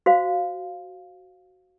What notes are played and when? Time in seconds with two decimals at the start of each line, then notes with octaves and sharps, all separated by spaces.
0.06 F#4 C5 F5